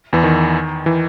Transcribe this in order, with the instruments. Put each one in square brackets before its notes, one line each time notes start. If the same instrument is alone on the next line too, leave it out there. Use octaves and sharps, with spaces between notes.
[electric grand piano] E2 E3
D#3
E3